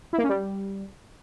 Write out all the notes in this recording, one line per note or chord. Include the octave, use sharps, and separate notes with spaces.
E4
A#3
C#4
G3